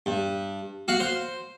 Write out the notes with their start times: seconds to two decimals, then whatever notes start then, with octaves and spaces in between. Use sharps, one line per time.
0.06 G2
0.88 F#4 F5 F#5
1.00 C5